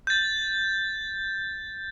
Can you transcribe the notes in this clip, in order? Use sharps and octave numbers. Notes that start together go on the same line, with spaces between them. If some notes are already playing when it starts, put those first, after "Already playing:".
G6 A6